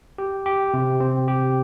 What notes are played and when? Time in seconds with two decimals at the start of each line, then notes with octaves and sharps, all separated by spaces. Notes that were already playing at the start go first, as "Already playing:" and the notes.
0.18 G4
0.46 G4
0.74 C3
1.00 C4
1.28 G4